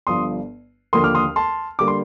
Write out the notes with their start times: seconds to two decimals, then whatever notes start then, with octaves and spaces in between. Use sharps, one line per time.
0.07 G1 G2 F3 C6 D#6
0.93 D#2 D3 F3 A#3 C6 D#6
1.04 D6 F6
1.15 C6 D#6
1.36 A5 C6
1.79 D3 G3 A#3 D6
1.88 C6